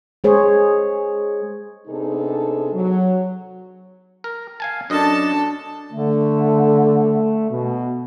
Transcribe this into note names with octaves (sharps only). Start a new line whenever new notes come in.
G#3 G#4 C5 C#5
C3 B3 D4 D#4 G#4 A4
F#3
A#4
F5 G#5 A5
F#2 D4 A4 D#5 A5
D3 A3
B2